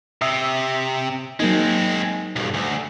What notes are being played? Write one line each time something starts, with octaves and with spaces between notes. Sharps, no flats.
C3 E5 D#6 E6
F#3 G#3 A#3 C4 D#4
B1 G2
D2